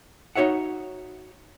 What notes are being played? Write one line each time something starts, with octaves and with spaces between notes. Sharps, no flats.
D#4 F#4 C#5 E5 F#5